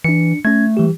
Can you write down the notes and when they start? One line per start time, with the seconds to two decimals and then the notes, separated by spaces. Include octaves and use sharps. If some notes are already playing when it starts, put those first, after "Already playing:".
0.04 E3 D4 C#7
0.45 A3 C#4 G#6
0.77 E3 G3 G4